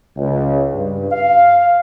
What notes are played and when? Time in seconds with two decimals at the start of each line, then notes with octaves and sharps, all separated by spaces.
0.16 C#2
0.72 G2
1.11 F5